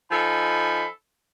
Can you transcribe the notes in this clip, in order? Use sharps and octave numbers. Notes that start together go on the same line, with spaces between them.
F3 D#4 A4 G#5 B5